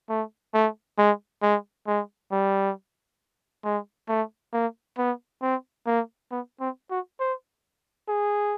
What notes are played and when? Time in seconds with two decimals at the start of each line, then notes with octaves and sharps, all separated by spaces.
0.09 A3
0.54 A3
0.98 G#3
1.42 G#3
1.87 G#3
2.31 G3
3.64 G#3
4.08 A3
4.53 A#3
4.98 B3
5.42 C4
5.87 A#3
6.31 B3
6.60 C4
6.90 F#4
7.20 C5
8.08 G#4